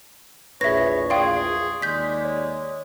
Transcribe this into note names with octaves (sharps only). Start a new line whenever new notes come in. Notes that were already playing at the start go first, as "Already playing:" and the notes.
A#1 E2 G#4 B4 C#5 E5 A#6
G#4 D5 F5 G5 C6 C#6 D#6
D#2 G#3 D5 G6 B6
C#5